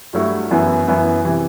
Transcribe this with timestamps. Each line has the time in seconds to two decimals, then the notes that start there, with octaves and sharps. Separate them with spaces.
0.13 G2 F#3 A3 E4
0.51 F#2 E3 B3 E4
0.88 F#2 E3 B3 E4
1.24 C3 E3